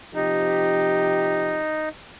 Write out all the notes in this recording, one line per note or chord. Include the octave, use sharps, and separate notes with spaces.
C3 F3 D#4 G4